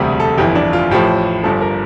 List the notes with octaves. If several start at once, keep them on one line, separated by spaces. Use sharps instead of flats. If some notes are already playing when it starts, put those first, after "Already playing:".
Already playing: E1 D2 C3 G3
A4
G1 F2 E3 G4
D4
F4
A1 A2 F3 G4
G1 G2 F3 A4
A#4